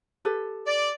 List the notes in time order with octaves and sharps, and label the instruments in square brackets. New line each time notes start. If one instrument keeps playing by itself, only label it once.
[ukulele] G4 A4 B4
[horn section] D5